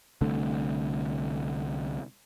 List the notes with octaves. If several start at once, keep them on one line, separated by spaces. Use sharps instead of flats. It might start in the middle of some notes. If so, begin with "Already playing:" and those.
C2 D3 A3